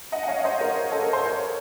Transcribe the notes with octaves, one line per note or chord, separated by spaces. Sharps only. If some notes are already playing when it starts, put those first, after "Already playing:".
D#5 F#5
F#5
C#5 F5
C5 D#5
A#4 C#5
A4
A#4
C5
A#4 C#5